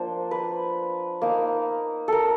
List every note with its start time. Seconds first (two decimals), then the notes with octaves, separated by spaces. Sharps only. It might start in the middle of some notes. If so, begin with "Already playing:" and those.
Already playing: F3 A#3 D4 C5
0.31 B4
1.22 A#3 D#4
2.08 A4 A#4